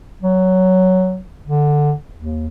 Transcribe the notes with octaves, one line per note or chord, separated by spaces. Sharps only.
F#3
D3
D#2